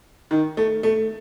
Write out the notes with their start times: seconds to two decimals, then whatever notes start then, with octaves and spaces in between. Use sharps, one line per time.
0.31 D#3
0.57 A3
0.83 A3